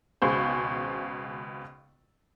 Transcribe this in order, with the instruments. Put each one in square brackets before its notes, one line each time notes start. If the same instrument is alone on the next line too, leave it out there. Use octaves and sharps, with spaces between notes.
[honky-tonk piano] G#1 C#2 B2 G#4 C5